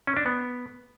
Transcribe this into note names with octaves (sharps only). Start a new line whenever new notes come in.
C#4
D4
B3